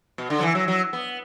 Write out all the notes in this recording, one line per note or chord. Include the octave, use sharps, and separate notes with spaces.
B2
D3
F#3
E3
F#3
F#3
B3